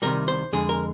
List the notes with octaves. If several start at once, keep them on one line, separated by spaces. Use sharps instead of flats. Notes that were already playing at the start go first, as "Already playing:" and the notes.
C2 C3 D#3 G3 A#4
C5
F2 D3 G#3 G#4
A#4